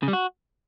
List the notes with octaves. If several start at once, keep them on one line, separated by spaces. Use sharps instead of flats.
C#3
G3
F#4